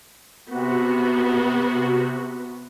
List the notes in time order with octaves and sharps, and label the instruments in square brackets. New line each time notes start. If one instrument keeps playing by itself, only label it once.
[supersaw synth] C3 F#4 [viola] B3